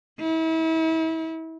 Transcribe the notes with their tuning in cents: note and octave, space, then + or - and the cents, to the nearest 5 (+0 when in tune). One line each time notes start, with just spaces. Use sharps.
E4 -35